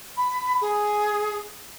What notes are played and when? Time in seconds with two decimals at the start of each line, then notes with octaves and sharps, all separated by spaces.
0.17 B5
0.61 G#4